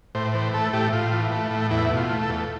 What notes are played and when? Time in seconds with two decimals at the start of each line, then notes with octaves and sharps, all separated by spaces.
0.15 A2 C5
0.34 E3 C5
0.54 A3 A4
0.73 A2 G4
0.93 A2 F4
1.12 E3
1.32 A3
1.51 A2
1.71 E2 E4
1.90 B2
1.97 F4
2.10 A3
2.23 A4
2.29 E2